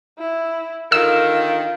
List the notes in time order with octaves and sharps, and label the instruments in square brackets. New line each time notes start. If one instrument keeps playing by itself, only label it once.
[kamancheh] E4
[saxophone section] D3 D#3 [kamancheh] F4 [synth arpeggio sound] E6